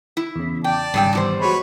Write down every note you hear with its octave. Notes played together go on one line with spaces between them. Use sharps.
E4
E2 C#3
D5 G5 A5
G#1 G2 C#3 G3 G5 E6
E2 G3 C5
F#3 G#3 B4 C#5 B5